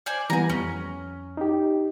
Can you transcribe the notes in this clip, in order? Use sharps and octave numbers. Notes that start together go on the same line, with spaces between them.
C5 D5 G#5
E3 G3 B3 G#5 A#5
F2 C#4
D#4 G4